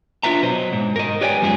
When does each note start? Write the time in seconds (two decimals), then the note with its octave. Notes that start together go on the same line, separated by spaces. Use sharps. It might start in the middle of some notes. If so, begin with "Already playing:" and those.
0.23 D4 F4 B4 E5 A#5
0.42 B2 F#3 C5 D#5
0.73 G#2
0.96 A#4 D#5
1.21 G4 B4 C#5 D5 G5 G#5
1.42 F#2 F3 G#3 C#4 F#4 G#4